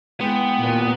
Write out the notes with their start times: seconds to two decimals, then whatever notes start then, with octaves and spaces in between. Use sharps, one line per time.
0.21 G#3 B3 E4 G#4 G5
0.59 D#2 A#2 E4 D5